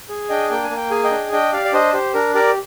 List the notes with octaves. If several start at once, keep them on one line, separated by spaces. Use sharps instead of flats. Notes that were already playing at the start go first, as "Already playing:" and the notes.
G#4
D4 D#5 G5
A#3 G5
G#5
A#3
G5
G#4 G#5
D#5 G5
D4
D4 D#5 G5
G4 D5 F5
D5
D4 C5 D#5
G4 C5
D4 A#4
G4 A#4 D5